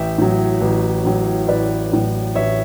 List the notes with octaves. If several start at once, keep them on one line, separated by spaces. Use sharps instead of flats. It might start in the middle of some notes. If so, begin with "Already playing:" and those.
Already playing: A1 E5 G5
A2 F#3
A1
A2 F#3
A1 B4 D5
A2 F#3
A1 C#5 E5